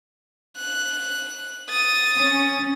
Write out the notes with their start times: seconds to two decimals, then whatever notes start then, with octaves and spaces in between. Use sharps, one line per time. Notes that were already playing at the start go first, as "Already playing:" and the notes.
0.57 F#6
1.70 D#6 A6
2.17 C#4